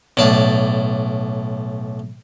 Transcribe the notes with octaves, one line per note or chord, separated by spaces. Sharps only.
B1 A2 D5 A5